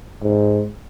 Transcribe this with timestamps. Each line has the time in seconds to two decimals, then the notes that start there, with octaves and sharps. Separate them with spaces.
0.23 G#2